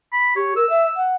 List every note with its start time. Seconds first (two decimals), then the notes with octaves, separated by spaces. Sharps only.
0.12 B5
0.36 G4 C#5
0.56 A#4 E6
0.70 E5
0.96 F#5